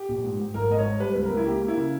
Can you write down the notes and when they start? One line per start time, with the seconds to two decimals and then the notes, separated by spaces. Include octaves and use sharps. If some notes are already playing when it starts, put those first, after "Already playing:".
Already playing: G4
0.09 A#1
0.24 G#2
0.39 G#2
0.54 G#1 A#4
0.70 G#2 D#5
0.78 C#5
0.85 G#2
1.00 G3 B4
1.13 C#2 B4
1.23 A#4
1.31 C#2
1.37 E4
1.46 A#3 G4
1.62 A#3
1.68 E4
1.77 C#3